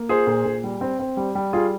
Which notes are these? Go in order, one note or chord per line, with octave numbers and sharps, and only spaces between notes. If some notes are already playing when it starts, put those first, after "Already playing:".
Already playing: A#3
F4 G#4 C5
A#2
A#2
G3
C4
C4
G3
G3
G3 F4 G#4